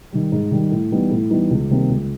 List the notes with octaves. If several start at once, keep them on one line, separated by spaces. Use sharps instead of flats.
D#3 G3
G#2
D#3 G3
A2
E3 G3 B3 D#4
A2
E3 G3 B3 D#4
C#2
C3 D#3 G3 A#3
C#2